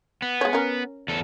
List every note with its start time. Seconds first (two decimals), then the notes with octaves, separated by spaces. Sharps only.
0.22 B3
0.41 G#3 C#5
0.53 C#4 A#4
1.08 E2 A4